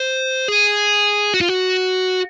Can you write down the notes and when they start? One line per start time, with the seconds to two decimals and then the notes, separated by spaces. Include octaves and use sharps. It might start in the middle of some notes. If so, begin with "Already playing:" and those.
Already playing: C5
0.48 G#4
1.34 F#4
1.41 F4
1.49 F#4